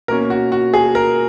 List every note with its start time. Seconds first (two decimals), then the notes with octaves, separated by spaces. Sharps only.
0.08 B2 A#3 C#4 A#4
0.30 F#4
0.52 F#4
0.74 G#4
0.95 A#4